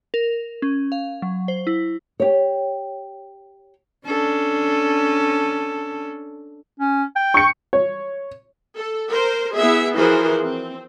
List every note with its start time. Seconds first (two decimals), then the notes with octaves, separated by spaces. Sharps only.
0.14 A#4
0.62 C#4
0.92 F5
1.22 F#3
1.48 C5
1.67 E4
2.20 G4 C#5
4.06 C#4 D4 A4
6.79 C#4
7.16 G5
7.34 C#6 C#7
7.73 C#5
8.77 A4
9.12 A#4 C5
9.57 B3 E4 G#4 E5
9.98 E3 F3 F#4 G#4 A#4 C5
10.44 C4